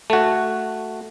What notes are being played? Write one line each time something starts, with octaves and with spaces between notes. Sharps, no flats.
A3 F#4